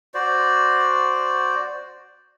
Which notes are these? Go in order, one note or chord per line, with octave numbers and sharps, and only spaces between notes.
F#4 C5 D5